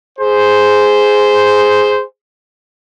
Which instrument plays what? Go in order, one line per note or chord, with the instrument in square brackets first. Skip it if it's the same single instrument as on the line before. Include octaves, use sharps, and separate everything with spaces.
[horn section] G#4 C5